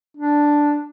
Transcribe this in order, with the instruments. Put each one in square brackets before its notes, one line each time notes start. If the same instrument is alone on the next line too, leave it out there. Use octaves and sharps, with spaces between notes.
[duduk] D4